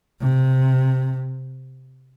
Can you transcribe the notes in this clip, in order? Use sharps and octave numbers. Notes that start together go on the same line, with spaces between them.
C3